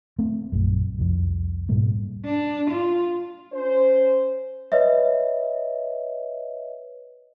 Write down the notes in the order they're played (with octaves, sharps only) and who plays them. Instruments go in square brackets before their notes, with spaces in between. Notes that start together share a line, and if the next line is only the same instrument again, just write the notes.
[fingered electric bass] A3 C4
A#1 F#2
C2 F2
G#2 B2 G3 A#3
[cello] D4
F4
[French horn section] C#4 C5
[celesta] B4 C#5 D#5 E5